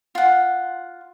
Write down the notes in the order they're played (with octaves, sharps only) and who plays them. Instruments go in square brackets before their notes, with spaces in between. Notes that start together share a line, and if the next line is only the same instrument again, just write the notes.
[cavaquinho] F4 F#5